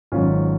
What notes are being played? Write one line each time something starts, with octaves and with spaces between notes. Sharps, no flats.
G#1 G#2 F#3 C#4 F4